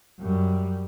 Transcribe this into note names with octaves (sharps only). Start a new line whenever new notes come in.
F#2 G3